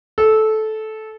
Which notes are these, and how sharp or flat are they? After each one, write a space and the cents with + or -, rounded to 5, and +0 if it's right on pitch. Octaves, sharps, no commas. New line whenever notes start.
A4 -15